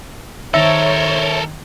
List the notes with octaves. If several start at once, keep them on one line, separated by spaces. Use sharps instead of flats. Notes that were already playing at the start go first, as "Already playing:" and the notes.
D#3 A4 A#4 C5 C#5 E5 A#6